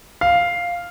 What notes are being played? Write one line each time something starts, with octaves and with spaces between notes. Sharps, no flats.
F5